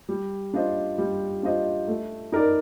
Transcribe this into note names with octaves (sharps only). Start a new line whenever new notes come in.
G3
D4 F4 C5 D#5
G3
D4 F4 C5 D#5
A3
D#4 A#4 D5